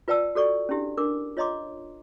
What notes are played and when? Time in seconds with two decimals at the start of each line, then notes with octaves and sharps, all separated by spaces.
0.08 F4 B4 D5 G5 A5 E6
0.35 F#4 A4 D5 C#6
0.69 C#4 D4 E4 G4
0.97 D4 A#4 D6
1.37 F4 C#5 D#5 A#5 C6 D6